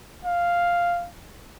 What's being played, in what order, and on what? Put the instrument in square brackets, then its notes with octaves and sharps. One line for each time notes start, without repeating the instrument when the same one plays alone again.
[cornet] F5